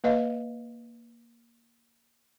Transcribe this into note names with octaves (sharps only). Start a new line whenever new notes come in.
A#3 B4 D#5 F5